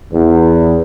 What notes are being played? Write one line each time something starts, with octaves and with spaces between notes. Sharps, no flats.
E2